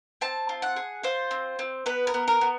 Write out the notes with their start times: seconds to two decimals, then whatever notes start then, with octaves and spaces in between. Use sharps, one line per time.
0.21 C4 A5
0.49 F4
0.62 F#5
0.76 G#4
1.03 F4 C5
1.31 C4
1.59 C4
1.86 B3 B4
2.07 A#4
2.14 B3
2.28 A#4
2.41 B3